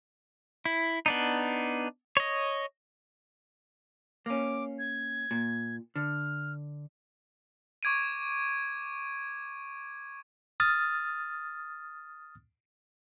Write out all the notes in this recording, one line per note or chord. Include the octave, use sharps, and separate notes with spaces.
E4
B3 D4 D#4
C#5 D#5
A#3 C#4 D6
G#6
A#2
D3 F6
C#6 D6 G#6 D7 D#7
D#6 F6 A6